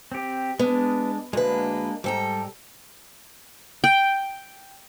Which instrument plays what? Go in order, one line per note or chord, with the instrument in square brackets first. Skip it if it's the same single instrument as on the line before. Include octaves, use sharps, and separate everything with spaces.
[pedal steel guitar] C4 G4
[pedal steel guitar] G#3 D4 [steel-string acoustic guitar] B3
[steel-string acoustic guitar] D2 B4 [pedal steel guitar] G#3 A#3 D4
[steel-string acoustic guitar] G#2 G5 A#5 [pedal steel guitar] G3 A4
[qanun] G5